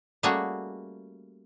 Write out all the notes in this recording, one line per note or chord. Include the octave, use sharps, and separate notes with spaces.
G3 A3 A#3 C#4 F#4 G#4